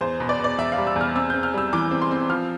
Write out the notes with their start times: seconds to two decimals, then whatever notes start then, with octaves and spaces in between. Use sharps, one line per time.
0.01 E2 C5
0.20 B2
0.29 D5
0.39 B2 D5
0.58 E2 E5
0.72 F5
0.78 G3
0.87 E6
0.96 E2
1.01 F6
1.15 C4 E6
1.30 C4 G6
1.43 F6
1.54 G3 E6
1.73 E3 D6
1.91 C4
2.01 C6
2.11 C4
2.30 F3 F6